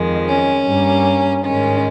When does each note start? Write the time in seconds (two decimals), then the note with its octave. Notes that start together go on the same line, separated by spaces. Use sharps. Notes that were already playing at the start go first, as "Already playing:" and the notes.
Already playing: F2 D#3 G#3
0.28 C#4
0.66 G2 G3 A#3
1.45 G#2 D#3 G#3 C#4